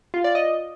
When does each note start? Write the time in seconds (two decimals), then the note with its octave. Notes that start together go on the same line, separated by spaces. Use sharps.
0.14 F4
0.24 D5
0.35 D#5